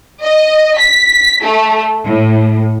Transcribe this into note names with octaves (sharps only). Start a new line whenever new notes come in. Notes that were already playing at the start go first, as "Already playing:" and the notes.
D#5
B6
A3
A2